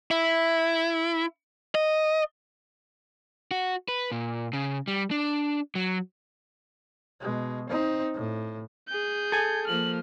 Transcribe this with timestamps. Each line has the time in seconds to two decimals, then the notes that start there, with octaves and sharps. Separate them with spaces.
0.11 E4
1.75 D#5
3.51 F#4
3.88 B4
4.11 A#2
4.53 C#3
4.88 G3
5.11 D4
5.75 F#3
7.20 B2 G#3
7.69 C4 D#4
8.14 A2
8.88 G#4 G6
9.32 A4 G#5 G#6
9.67 F3 A#3 F6 F#7